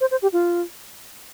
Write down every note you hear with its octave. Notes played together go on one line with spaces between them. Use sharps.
C5
C5
G4
F4